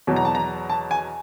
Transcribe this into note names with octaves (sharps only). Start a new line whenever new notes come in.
E2 B2 F#3
A#5
A5
A#5
A5
G#5